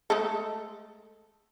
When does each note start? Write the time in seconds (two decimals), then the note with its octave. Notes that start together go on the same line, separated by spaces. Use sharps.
0.10 G#3 A3 A4